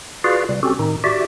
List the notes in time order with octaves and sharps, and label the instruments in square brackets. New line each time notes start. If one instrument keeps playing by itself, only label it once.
[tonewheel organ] F4 F#4 G#4 B4 D5 F5
C3 G3
C4 C#4 F#4 G4 A4
A2 D#3 D#4
F#4 G4 D5 E5